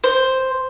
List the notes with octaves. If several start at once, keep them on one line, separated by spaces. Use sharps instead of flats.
C5